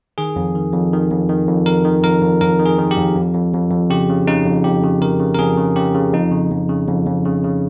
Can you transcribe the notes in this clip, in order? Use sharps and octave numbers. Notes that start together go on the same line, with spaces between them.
D#3 G#4
F2
D#3
F2
D#3
F2
D#3
F2
F2 A#4
D#3
F2 A#4
F2
F2 A#4
D#3
G#4
D#3
G4
F2
F2
F2
F2
F2
C#3 G4
C#3
C#3 D#4
F2
F2 G4
C#3
C#3 A#4
C#3
A#4
F2 G#4
C#3
C#3 G4
C#3
F2 D#4
C#3
F2
C#3
F2
F2
C#3
C#3